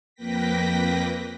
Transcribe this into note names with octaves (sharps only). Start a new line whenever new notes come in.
F2 A#3 B4 G5 A#6 B6